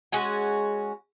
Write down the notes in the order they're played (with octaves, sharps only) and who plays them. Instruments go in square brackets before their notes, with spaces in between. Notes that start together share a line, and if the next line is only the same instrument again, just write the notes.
[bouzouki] G#3 C#4 F#4 G#5